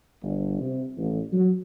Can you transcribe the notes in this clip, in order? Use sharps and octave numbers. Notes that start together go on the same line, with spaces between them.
G1
C3
A1
F#3